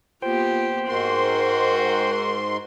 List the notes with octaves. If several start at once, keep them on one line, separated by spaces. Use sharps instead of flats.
A#3 B3 F4 G4 C5 G5
G#2 F#4 A#4 C6